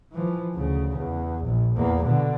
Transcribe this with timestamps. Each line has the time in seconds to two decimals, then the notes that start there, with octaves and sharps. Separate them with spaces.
0.12 E3 F3
0.55 D2 C#3
0.96 E2
1.45 A#1
1.76 E2 A#3
2.05 B2 D3